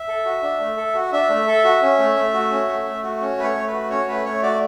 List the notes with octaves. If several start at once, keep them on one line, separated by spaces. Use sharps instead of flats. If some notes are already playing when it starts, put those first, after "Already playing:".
Already playing: E5
A4
F#4
D4
A3
A4
F#4
D4 E5
A3
A4
F#4
C#4
A3
A3
F#4
C#4
A3
A3
F#4
C#4
A3 B4
C#5
A3
B4
F#4
C#4 C#5
A3 B4
A3 C#5
F#4 D5